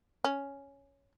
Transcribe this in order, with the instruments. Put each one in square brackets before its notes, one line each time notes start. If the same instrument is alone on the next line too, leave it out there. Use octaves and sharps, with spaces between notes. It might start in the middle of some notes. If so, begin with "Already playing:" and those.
[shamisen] C#4